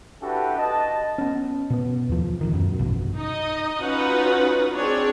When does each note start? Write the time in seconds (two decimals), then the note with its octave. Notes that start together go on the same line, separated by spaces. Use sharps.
0.22 D4 E4 F#4 G4 A4 B4
0.58 D#5 A5
1.18 B3 C#4
1.70 B2 B3
2.09 D#2 F3
2.41 D1 A#1 D#3
2.53 F#2 B2
2.79 A#1 G2 B2
3.15 D#4 D#5
3.79 C#4 D#4 F4 F#4 B4 F#5
4.74 C4 D4 G#4 C#5